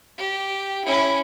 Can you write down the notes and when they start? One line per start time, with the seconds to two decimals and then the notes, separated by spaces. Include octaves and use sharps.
0.18 G4
0.85 C#4 E4